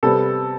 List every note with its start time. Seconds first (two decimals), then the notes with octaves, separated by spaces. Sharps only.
0.03 C3 G3 B3 A4